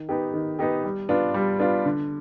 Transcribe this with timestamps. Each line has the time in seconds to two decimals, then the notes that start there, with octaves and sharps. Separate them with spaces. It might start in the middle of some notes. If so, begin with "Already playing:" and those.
Already playing: D#3
0.09 B3 D#4 G4
0.34 D#3
0.59 B3 D#4 G4
0.84 G3
1.09 B3 D4 F4
1.34 G3
1.59 B3 D4 F4
1.85 D3